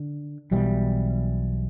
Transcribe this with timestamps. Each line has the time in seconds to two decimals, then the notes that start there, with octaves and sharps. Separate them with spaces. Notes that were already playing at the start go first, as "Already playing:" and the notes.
Already playing: D3
0.51 B1 B2 E3 G3